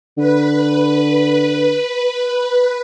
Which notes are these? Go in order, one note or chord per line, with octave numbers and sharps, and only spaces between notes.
D3 B4